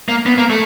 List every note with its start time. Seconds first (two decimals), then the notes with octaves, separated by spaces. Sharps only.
0.08 A#3
0.26 B3
0.38 A#3
0.50 A3